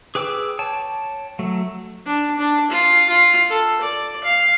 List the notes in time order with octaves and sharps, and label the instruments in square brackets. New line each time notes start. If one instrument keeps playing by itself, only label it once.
[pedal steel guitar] G#4 B4 G5 D6 E6
C#5 G5 A5
F#3 A3
[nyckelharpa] D4
D4
F4
F4
A4
D5
F5